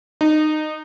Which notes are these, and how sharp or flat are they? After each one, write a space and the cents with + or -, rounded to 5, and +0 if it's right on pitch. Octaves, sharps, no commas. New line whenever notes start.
D#4 -20